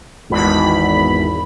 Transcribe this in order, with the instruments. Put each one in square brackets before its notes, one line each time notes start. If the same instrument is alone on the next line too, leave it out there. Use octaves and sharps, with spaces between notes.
[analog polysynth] G#1 E2 B5